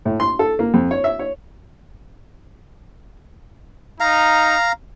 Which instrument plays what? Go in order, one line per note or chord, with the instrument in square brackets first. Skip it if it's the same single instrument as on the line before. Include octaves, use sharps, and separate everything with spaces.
[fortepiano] A2
C6
A4
A#3
F2
C#5
E5
C#5
[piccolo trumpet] D#4 [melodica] F5 A#5